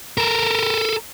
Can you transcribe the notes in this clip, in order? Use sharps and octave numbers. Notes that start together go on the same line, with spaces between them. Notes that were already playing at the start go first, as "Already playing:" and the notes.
A4 A#4